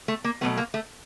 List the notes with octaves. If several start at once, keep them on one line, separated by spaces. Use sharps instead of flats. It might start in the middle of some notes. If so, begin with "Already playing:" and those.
A3
A#3
B2 F#3 A3 B3
A#3
A3